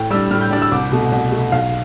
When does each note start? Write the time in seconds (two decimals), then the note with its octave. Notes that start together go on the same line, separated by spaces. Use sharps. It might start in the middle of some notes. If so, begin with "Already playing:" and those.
Already playing: A2 G5
0.10 G3 D4 E6
0.31 A2 F6
0.41 G6
0.51 G3 D4
0.62 E6
0.72 C2 D6
0.92 B2 A3
1.12 C2
1.32 B2 A3
1.52 B1 F5